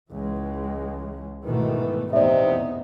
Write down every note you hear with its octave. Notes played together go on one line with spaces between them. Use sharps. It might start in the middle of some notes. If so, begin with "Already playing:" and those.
C#2 E3 G#3
G#2 B2 D#3 E3 A3
A1 E2 C3 B3 D#4 D5 E5